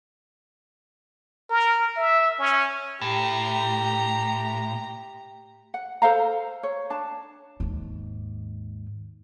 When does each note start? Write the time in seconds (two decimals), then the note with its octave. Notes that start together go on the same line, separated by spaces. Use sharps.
1.49 A#4
1.96 E5
2.39 C#4
3.01 A2 G4 A#5
5.74 F#5
6.02 A4 C5 F5 A#5
6.63 C#5
6.90 D4 A5
7.60 D#2 G#2